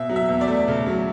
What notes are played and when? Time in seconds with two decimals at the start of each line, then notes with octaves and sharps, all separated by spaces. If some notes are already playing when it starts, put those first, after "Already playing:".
Already playing: B2 E5
0.09 F#3
0.16 E5
0.29 E2
0.41 D5
0.48 A3
0.68 C#3
0.86 F#3